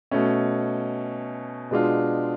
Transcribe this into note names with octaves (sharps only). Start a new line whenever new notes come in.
B2 A3 C#4
B2 G#3 D4 F4